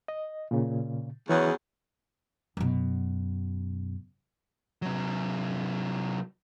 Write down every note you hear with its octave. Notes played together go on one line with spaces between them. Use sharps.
D#5
A#2 C#3
E2 C#3 E3 F#3
F#2 B2
C3 F#3